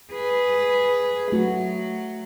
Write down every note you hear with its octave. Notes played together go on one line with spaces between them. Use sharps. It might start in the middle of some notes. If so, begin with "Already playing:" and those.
G#4 B4
F#3 A3 F#4